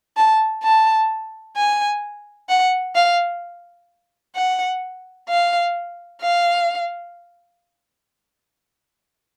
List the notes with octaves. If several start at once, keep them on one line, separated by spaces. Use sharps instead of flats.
A5
A5
G#5
F#5
F5
F#5
F5
F5